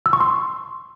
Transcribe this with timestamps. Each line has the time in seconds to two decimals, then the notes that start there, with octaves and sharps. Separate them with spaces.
0.06 E6
0.13 C#6
0.20 C6